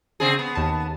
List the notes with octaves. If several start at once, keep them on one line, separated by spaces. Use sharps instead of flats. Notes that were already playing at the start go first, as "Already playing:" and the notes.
C#3 C4 G#4
B3
D#2 A5